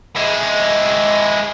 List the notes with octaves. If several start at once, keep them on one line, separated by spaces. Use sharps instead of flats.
G#3 E4